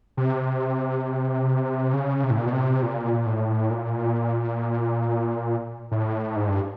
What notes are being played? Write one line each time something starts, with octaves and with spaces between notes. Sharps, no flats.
C3
C#3
C3
A2
A#2
B2
C3
A#2
A2
A#2
A2
G#2
G2